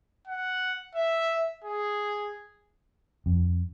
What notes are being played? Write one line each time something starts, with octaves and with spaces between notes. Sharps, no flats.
F#5
E5
G#4
F2